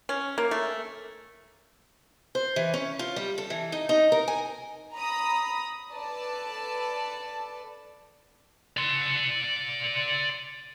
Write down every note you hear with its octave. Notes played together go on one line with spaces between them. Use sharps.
C#4
A#3
A3
C5
E3
C#4
F4
G3
A4
E3
D#4
D#4
A#4
G#5
A#5 B5 D#6
A4 B4 D5 A5
D5 C6